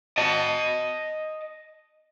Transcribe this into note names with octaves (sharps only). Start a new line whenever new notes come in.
D#5 A5